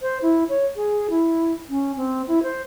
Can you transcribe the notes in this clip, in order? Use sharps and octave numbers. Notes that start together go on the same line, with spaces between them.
C5
E4
C#5
G#4
E4
C#4
C4
E4
C5